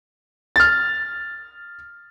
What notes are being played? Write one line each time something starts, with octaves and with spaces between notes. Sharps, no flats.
F6 A6